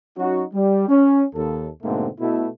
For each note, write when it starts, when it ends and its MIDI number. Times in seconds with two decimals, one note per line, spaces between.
0.18 0.43 54
0.18 0.43 61
0.18 0.43 63
0.18 0.43 66
0.54 0.87 55
0.89 1.23 61
1.35 1.68 39
1.35 1.68 69
1.82 2.09 44
1.82 2.09 47
1.82 2.09 50
1.82 2.09 57
1.82 2.09 58
1.82 2.09 60
2.20 2.47 47
2.20 2.47 57
2.20 2.47 64